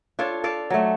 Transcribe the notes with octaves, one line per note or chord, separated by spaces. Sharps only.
D4 F4 A4 C#5
A4 D5 F5
F#3 A3